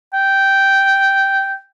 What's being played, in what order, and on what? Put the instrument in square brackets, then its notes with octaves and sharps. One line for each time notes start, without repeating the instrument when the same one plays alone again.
[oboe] G5